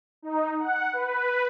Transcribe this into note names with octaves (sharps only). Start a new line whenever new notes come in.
D#4
F#5
B4